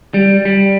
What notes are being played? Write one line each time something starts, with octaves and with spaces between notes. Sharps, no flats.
G3
G3